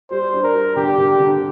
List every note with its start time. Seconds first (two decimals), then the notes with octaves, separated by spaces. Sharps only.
0.10 G3 C5
0.33 D4
0.43 A#4
0.54 G3
0.76 D3 G4
0.98 D3
1.20 D3